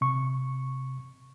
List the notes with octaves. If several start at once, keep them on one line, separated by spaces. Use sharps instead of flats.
C3 C#6